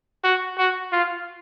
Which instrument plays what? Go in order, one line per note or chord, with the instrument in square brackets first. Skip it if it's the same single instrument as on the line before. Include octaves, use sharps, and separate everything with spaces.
[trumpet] F#4
F#4
F4